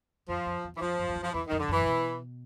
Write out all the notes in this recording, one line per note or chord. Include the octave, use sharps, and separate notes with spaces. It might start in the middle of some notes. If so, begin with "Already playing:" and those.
F2 F3
F2
E2
E3
F2 F3
F#2
E2
F2
F3
E2 E3
D#3
F2
D3
F#2 E3
A#2
B2